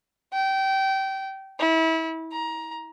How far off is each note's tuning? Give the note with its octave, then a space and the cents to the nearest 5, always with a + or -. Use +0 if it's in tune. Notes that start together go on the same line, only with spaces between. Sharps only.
G5 -25
E4 -30
A#5 +20